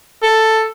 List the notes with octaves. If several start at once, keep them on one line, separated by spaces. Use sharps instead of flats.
A4